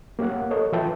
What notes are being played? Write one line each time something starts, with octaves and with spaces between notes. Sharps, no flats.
A#3 G4 C#5 F5 F#5
A4 A#4 C#5 D#5
E3 F4 B4 E5 G5 A5